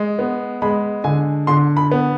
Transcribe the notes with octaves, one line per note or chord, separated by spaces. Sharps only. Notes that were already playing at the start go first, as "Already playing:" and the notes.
Already playing: G#3
B3
G#3 B5
D3 G#5
D3 C6
B5
B3